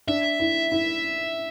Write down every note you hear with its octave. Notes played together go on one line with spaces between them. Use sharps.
D4 E5
E4
E4